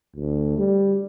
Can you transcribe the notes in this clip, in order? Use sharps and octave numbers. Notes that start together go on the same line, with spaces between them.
D2
G3